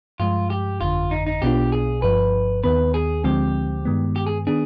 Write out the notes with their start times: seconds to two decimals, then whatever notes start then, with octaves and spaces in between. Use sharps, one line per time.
0.20 G2 F3 G#3 F4
0.50 G4
0.81 G1 F2 D3 F4
1.11 D#4
1.27 D#4
1.42 B1 B2 B3 D4 F4 G4
1.72 G#4
2.02 G1 G2 F3 B4
2.64 D#2 D#3 B3 B4
2.94 G#4
3.24 D2 D3 F3 G#3 C4 G4
3.85 G2 D#3 G#3 B3
4.16 G4
4.27 G#4
4.47 D#3 B3 D4 G#4